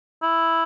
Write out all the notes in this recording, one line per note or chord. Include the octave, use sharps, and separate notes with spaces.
E4